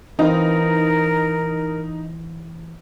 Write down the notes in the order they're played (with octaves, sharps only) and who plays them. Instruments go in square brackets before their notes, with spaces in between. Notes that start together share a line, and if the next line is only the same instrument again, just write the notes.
[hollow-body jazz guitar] E3 C4 F4 [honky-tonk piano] D#4 [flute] A#4